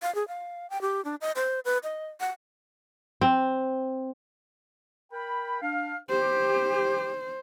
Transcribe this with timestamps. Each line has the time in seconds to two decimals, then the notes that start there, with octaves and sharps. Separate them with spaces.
0.02 F5
0.15 G#4
0.28 F5
0.70 G5
0.81 G4
1.05 D4
1.21 D#5
1.36 C5
1.65 B4
1.84 D#5
2.20 F#5
3.21 C4
5.12 A#4 G5 B5
5.61 D4 F5
6.10 G4 C5